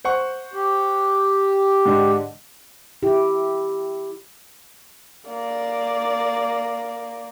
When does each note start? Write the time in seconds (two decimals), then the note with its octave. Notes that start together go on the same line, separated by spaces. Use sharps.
0.05 C5 F#5 C#6
0.54 G4
1.85 G#2 D3
3.03 E4 G4
5.28 A#3 D5